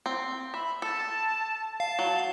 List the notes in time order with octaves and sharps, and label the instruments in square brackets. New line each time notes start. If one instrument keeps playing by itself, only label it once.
[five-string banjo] C4
[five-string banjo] E5 [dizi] B5
[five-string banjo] A4 [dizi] A5
[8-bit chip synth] F5 [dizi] A5
[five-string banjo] F#3